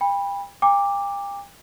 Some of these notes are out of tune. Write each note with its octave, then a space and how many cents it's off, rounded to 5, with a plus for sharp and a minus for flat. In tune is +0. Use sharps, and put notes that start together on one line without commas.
G5 +35 B5 -10
G5 +40 A#5 -40 D6 +0